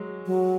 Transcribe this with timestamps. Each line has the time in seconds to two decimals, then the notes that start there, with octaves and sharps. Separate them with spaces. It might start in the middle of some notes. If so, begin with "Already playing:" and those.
Already playing: F#3 G#3
0.26 F#3